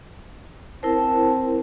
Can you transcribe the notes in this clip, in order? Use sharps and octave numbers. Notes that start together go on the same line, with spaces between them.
C4 E4 A#4 C5 A5